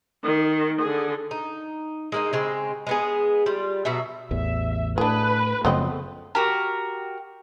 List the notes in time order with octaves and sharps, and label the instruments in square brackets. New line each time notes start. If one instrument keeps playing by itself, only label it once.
[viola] D#3
D3 G#4
[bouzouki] D#4
G#3 A#3 D#4
C#3 G#3 C4
G#3 B3 G#4
G3 F4
B2 F#3 F#4 E5
[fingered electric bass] A1 E2 [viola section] E5
[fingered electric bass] A2 [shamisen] D4 G#4 [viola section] B4
[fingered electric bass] F#2 C#3 F3 [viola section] A3 [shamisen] B3 C4 D#5
[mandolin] F#4 G4 A#4